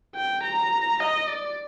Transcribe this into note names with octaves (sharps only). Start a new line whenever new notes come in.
G5
A#5
D#5
D5